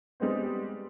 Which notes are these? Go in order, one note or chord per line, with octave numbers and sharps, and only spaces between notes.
G3 G#3 B3 C4